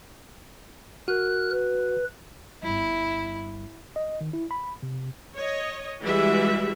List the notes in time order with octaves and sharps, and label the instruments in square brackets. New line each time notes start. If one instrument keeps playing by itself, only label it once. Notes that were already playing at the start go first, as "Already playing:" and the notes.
[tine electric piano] F#4 [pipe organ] A#4 F#6
[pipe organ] B4
[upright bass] G1 G2 [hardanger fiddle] E4
[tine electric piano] D#5
D#3
E4
B5
C3
[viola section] C#5 D#5
E3 G3 G#3 F#4 E5